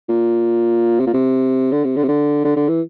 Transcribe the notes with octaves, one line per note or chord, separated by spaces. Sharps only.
A#2
C3
A#2
C3
D3
C3
D3
C3
D3
D3
D3
E3